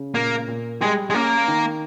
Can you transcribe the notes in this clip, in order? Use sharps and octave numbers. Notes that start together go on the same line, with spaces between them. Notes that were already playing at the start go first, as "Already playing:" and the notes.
Already playing: C#3
A#2 A#3
A#2
G3 G#3
G#3
A#3 C#4
D#3